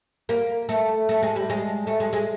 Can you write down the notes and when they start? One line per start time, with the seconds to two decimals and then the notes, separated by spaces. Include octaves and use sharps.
0.29 A#3
0.69 A3
1.09 A3
1.23 G#3
1.36 G3
1.50 G#3
1.87 A3
2.00 G#3
2.13 G#3